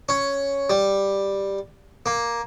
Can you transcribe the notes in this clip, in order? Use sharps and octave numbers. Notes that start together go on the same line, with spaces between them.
C#4
G3
A#3